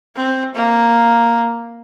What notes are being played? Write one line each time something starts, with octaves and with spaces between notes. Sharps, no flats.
C4
A#3